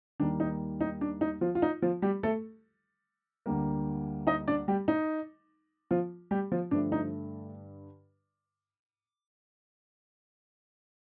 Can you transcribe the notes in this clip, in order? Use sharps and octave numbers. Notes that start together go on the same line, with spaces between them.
D#2 D#3 G3 A#3 D4
D#4
D#4
D4
D#4
F3 F4
F4
D#4
F3 F4
G3 G4
A3 A4
D2 D3 G3 A#3
D#4 D#5
D4 D5
G3 G4
D#4
F3 F4
G3 G4
F3 F4
G2 D3 F3 A3 D4
D#4